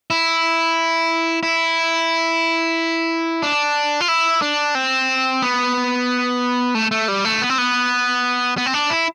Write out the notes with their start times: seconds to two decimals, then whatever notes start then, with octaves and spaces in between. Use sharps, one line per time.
0.10 E4
1.43 E4
3.43 D4
4.01 F4
4.08 E4
4.42 D4
4.75 C4
5.42 B3
6.75 A3
6.91 A3
7.08 G3
7.25 A3
7.42 B3
7.50 C4
7.58 B3
8.57 B3
8.66 C4
8.74 D4
8.90 E4